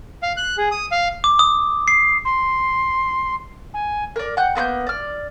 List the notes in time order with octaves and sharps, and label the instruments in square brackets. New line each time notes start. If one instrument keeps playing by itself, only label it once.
[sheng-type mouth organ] F5
F#6
G#4
D#6
F5
[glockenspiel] D6
D#6
C7
[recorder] C6
G#5
[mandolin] A#4 D5
F#5 G5 F#6 G6
A#3 B3 B5 G6
D5 F6